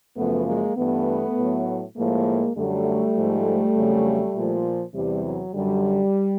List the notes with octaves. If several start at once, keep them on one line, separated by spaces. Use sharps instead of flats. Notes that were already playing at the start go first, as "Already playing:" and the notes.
F#2 C#3 F3 A3 B3
G#3 A#3
G2 E3 A3 B3
A2 F#3
A2 F3 G#3 A#3
F#2 D3 F#3 G3 A3
G#2 F3
F2 C#3 F#3
A#2 F3
E2 C3 E3 G3
F#3
F#2 D3 F#3 G3